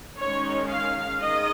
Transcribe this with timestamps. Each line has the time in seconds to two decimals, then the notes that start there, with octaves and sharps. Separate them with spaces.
0.16 D#3 G#3 C#4 C#5
0.69 F5
1.21 D#3 G#3 D#5